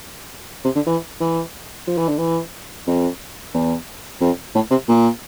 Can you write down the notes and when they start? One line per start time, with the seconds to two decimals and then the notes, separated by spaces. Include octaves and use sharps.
0.65 C3
0.75 D3
0.86 E3
1.20 E3
1.87 F3
1.98 E3
2.08 D3
2.18 E3
2.87 F2
3.54 E2
4.21 F2
4.55 A2
4.70 C3
4.88 A#2